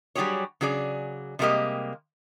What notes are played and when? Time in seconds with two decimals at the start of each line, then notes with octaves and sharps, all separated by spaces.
0.15 F#3 G3 E4 G4 G#4 C#5
0.61 C#3 F#3 G#4 D5
1.39 C3 G3 G#3 A#3 G4 D#5